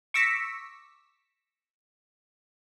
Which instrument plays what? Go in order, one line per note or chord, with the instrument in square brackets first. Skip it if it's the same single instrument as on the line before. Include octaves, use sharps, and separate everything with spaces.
[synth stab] C#6 D6 E6 A#6 B6 C#7